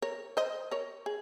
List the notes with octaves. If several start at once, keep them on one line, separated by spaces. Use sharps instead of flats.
A#4 C#5
C5 D#5
A#4 C#5
G#4